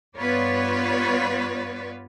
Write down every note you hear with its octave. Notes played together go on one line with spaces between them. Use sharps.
G2 B3 F4 B4 C#5 D5